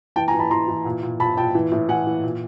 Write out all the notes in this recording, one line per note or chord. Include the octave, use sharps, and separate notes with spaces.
E3 G5 A5
G#5 A#5
E3
A5 B5
E3 A#5 C6
E3
A#2
A#2
A#2 A5 B5
A#2 G5 A5
E3
A2
E3 F#5 G#5
E3
A#2